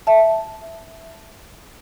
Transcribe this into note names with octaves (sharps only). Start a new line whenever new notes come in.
E5 A5